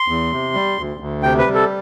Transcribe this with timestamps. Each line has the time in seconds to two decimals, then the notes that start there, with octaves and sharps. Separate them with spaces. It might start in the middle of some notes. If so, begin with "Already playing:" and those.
Already playing: C6
0.08 E2
0.32 C3
0.54 G3
0.77 D2
1.00 D2
1.23 C3 G5
1.38 B4
1.47 G3
1.54 A4